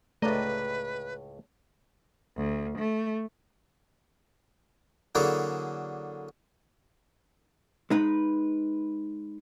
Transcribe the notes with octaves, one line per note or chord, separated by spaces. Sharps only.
C#2 A2 A3 B4 D5 D#5 A#5
D2
A3
D3 F#3 A#3 E4 G#4 A4
G#3 D#4 B4